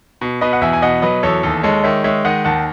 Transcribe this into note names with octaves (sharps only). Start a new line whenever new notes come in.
B2
B2 B4 D#5
F#5
E2 E5 G#5
G#5
B2 D#5 F#5
F#3 B4 D#5
E2 A4 C#5
D#2 A4
G#3 A4 C#5
D#3 C#5 E5
G#3 C#5 E5
D#3 D#5 F#5
D#2 F#5 A5